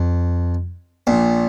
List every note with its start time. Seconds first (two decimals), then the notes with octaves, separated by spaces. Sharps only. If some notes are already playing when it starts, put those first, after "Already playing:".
Already playing: F2
1.07 A#1 A#2